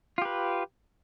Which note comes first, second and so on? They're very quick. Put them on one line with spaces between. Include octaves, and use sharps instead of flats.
F4 G4 B4